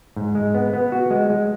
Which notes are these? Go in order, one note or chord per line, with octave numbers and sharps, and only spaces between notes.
G#2
G#3
B3
B3
F#4
G#3
G#3